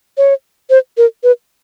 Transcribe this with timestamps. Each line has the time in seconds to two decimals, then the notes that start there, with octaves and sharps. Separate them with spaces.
0.17 C#5
0.70 C5
0.98 A#4
1.23 B4